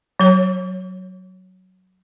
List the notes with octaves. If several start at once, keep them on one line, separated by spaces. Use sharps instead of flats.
F#3 C#5